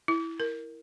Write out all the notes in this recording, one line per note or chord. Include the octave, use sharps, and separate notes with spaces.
E4
A#4